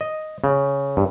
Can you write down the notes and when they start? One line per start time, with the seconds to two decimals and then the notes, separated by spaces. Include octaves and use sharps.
0.01 D#5
0.44 C#3
0.97 G2